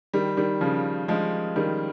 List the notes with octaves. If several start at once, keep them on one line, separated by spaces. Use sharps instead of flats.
D#3 G3
D#3 G3
C#3 F3
F3 G#3
D#3 G3